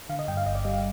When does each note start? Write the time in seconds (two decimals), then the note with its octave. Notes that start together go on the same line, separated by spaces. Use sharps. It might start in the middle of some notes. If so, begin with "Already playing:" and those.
0.09 D3 F5
0.19 D#5
0.28 G2 G5
0.37 F5
0.46 G1 D#5
0.55 D5
0.65 G3 D#5
0.73 F5